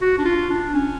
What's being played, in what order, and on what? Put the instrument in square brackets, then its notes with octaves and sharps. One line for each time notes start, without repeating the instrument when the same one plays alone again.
[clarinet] F#4
D4
F4
D4
C#4